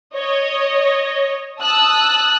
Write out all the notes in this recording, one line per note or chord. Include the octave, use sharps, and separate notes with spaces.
C#5 D#5
A5 D#6 E6 F#6